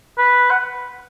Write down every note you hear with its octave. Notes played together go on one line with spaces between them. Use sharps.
B4
F#5